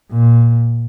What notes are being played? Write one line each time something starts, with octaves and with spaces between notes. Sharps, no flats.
A#2